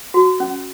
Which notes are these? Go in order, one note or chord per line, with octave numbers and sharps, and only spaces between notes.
F#4
C#4